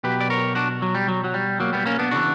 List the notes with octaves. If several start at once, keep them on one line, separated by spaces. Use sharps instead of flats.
B2 F#3 G4 B4
D5
A#4 C#5
D4 F#4
F#3
G3
F#3
F#3
G3
F#3 A#3
G3 B3
A#3 C#4
B3 D4
C#3 E3 D4 F#4